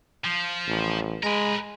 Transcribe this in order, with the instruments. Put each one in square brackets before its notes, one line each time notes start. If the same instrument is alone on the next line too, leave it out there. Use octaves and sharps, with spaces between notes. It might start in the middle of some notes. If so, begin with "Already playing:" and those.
[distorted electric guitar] F3
[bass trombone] A1
[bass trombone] G#3 [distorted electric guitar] A#4 B4